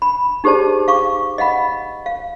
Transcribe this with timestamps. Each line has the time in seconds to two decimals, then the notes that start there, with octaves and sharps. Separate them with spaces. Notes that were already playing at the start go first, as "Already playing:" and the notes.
0.02 B5
0.44 D#4 G4 G#4 C5 D5 A5
0.88 F5 C#6 D6
1.38 D#5 F5 F#5 B5
2.06 F5